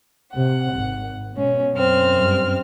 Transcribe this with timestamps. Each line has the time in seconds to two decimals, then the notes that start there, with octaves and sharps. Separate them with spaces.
0.33 C3 F#5
0.73 G#1
1.35 B2 G#3 C#4
1.75 F#2 C4 F6
2.12 G2